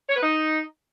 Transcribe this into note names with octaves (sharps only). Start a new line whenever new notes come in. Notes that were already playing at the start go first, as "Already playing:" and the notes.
C#5
B4
D#4